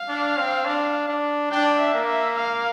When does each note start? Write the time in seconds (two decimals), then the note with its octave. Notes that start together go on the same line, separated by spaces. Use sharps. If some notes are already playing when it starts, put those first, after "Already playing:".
Already playing: F5
0.08 D4
0.37 C4
0.65 D4
1.08 D4
1.51 D4 G5
1.79 E5
1.94 A#3
2.07 E5
2.36 F5